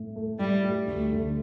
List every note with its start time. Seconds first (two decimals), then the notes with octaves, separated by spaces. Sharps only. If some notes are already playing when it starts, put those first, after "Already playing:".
Already playing: A2
0.16 A3
0.39 A2 G3
0.64 G3
0.87 D2 A3
1.11 D3